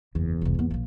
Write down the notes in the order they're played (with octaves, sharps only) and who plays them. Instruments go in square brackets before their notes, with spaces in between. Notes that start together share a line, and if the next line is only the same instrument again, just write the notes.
[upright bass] F#1 [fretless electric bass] E2
[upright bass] F1 C2
G#2 B3
A#1 F3